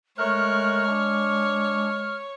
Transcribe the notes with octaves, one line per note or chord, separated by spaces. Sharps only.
G#3 A3 A#4 C#5 F6 F#6
D4